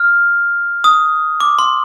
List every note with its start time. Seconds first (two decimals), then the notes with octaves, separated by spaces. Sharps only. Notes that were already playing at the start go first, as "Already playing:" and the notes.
Already playing: F6
0.84 D#6
1.40 D6
1.59 C6